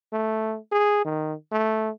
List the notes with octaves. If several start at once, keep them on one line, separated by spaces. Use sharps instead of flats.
A3
G#4
D#3
A3